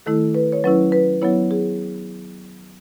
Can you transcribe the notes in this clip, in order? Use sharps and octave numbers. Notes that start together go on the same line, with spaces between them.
D#3 A3 E4 A4
B4
C#5
F#3 C#4 E4 B4
B4
F#3 B3 E4 C#5
G#4